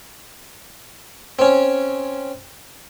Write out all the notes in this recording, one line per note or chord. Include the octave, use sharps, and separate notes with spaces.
C4 C#4